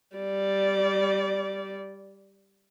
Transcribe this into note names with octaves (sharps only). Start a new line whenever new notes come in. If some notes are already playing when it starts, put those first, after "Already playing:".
G3 D5